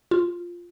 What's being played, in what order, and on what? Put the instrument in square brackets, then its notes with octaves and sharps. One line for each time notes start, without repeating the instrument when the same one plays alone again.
[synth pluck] F4